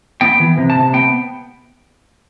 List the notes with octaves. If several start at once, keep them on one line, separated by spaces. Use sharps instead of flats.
B3 G5
E3
C3
A5
C3
B3 G5